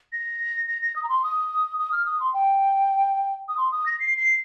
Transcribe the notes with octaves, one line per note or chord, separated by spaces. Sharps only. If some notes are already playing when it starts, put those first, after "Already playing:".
A#6
A#6
A#6
D#6
A#5
C6
D#6
D#6
F6
D#6
C6
G5
D#6
C6
D#6
A#6
C7
C7